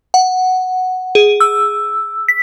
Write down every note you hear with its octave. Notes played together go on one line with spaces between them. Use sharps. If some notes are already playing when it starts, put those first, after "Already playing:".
F#5
G#4
E6
B6